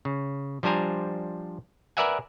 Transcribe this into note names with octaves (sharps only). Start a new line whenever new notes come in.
C#3
F3 G3 D4 C5 G#5 A#5
A#4 B4 D5 E5 F#5 G#5